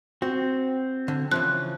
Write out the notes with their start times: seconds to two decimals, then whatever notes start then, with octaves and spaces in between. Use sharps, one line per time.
0.22 C4 F#4
1.08 D3
1.32 C#3 E3 F3 F#6